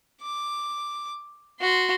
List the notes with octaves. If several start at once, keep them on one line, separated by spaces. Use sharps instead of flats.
D6
F#4 C6